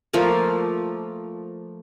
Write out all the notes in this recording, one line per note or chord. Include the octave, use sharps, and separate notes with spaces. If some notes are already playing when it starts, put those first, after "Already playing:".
F3 A3 A#3 A#4